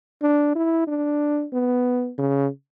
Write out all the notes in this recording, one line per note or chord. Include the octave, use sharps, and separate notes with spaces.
D4
E4
D4
B3
C#3